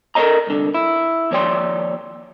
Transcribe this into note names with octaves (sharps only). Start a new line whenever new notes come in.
A4 A#4 C5 C#5 D#5 A#5
C2 D3
E4
D#2 F3 C#5 D5 G5 C6